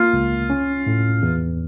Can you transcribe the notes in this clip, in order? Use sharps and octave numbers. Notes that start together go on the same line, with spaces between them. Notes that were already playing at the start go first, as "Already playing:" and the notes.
Already playing: A#3 F4
C#2
C#4
A2
E2